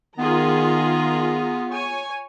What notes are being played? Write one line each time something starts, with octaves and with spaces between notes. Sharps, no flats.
D#3 B3 F4 G#4 A#5
C#5 G#5